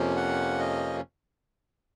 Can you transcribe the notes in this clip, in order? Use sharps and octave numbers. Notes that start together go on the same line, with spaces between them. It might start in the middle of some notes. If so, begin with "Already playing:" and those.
Already playing: F2 C3 F3 A#3 C#4
F#5
D#5